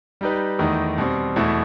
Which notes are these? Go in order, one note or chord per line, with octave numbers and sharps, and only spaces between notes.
G3 D#4 G4 B4
E2 D#3 A3 D#4
B2 G3 C4
E2 B2 A3 E4